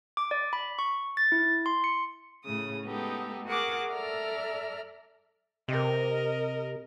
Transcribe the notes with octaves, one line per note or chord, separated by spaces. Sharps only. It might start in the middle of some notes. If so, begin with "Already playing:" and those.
D6
D5
B5
C#6
A6
E4
C6
C#7
A2 C#3 D#6
G#3 A3 B3 D#4 G4 A4
F#4 G#4 A#4 F#5 D6
A4 D5 E5 A#5 F6
C3 A#4 D#5